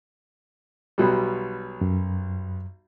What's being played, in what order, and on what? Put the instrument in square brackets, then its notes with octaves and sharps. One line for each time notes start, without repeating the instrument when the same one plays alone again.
[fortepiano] B1 B2 G3
[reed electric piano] F#2